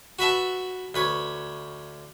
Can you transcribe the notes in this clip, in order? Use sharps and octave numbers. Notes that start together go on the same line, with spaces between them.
F#4 B4 E5 A5
D2 B4 C#5